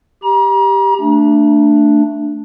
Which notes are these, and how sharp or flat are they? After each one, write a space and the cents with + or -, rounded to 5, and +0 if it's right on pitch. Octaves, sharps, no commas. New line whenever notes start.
G4 +5 A#5 +40
A3 +15 D4 +0